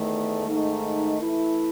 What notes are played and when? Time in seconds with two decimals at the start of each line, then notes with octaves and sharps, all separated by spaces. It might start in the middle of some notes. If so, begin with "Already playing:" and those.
Already playing: E2 D#3 A3
0.46 G#2 D#3 A3 D#4
1.20 E3 A3 E4